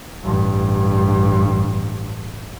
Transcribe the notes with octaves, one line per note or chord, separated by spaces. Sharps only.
A1 G2